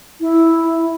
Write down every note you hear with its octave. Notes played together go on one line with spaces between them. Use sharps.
E4